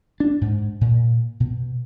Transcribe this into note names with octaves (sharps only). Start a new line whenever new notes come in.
D4
G#2
A#2
B2